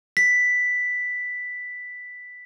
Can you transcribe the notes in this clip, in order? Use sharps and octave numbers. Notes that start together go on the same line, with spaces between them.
B6